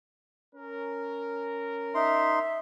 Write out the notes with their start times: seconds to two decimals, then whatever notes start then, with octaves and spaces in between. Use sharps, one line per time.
0.55 C#4 A#4
1.95 D#4 E5 C6